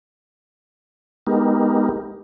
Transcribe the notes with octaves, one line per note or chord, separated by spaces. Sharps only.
G#3 B3 D#4 G4 A#4